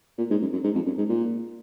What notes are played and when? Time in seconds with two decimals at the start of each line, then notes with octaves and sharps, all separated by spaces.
0.18 A#2
0.31 G#2
0.42 F#2
0.53 F#2
0.64 G#2
0.75 F2
0.86 F#2
0.98 G#2
1.09 A#2